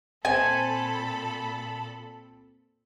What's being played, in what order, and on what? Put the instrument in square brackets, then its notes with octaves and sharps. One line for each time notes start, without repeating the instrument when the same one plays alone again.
[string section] A#2 A4 B5 [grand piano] C4 [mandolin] G#5